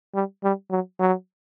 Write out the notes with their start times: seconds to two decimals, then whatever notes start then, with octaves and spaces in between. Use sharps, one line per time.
0.14 G3
0.43 G3
0.71 F#3
1.00 F#3